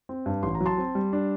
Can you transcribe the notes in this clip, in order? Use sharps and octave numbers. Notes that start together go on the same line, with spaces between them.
C4
G2
A1 C6
A#5
F#3
A5 C6
C4
G3
D4